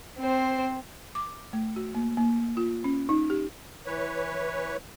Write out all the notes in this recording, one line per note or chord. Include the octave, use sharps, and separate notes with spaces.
C4 C5
D6
A3
F#4
A#3
A#3
F4
C#4
D#4
G4
E3 B4 C#5